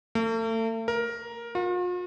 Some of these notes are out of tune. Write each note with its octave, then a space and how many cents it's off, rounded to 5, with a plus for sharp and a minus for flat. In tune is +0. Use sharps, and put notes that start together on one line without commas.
A3 +40
A#4 +10
F4 +45